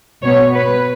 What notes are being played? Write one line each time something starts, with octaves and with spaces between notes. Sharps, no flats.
B2 B3 C#5
B4